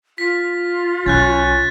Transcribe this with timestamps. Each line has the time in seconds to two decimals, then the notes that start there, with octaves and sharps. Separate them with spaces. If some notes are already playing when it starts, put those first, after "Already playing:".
0.18 F4 B6
1.06 B1 C#4 F#6 G6 A6